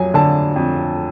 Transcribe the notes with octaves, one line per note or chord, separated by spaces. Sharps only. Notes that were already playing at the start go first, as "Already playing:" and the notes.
Already playing: F2 F#3 G#5
D3 A5
F2